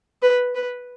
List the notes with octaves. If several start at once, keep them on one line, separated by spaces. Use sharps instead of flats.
B4
B4